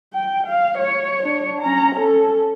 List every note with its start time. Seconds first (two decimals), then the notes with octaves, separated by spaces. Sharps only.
0.14 G5
0.47 F5
0.78 C#5
1.23 D4 C#5
1.62 C#4 A#5
1.95 C#4 A4